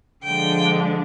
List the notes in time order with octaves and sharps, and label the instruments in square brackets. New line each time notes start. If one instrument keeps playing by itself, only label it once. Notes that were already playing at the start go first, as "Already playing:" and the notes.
[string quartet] D3 F3 G#3 D4 G5